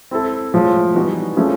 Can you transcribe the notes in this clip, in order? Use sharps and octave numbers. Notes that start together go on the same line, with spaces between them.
C4 E4 A4
A2 F3 G#3
E3 G3 B3 D#4 F#4
F3 A3 C#4 E4 G#4